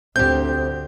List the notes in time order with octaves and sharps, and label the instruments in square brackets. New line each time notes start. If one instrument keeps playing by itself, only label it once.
[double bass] D2 [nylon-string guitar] C4 G4 [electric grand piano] G6